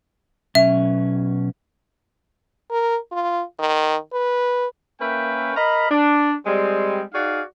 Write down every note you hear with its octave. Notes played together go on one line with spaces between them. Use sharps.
B2 F#3 C#4 E5
A#4
F4
D#3
B4
A#3 C#4 A#4 B4 E5 G5
A#4 D#5 F5 A#5 B5
D4
G3 G#3 C4
D#4 F#4 G#4 D5 F5